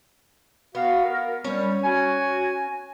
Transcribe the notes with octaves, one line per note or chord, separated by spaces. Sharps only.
B3 F#4 F5
A#4
G3 C#4 C#5
F#4 G#5